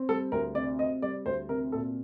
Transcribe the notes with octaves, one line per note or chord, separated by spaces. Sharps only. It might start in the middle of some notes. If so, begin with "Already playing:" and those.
Already playing: C4
G3 A4
D2 A#4
C3 D5
C4 D#5
G3 D5
D2 C5
C3 A#4
A#2 A4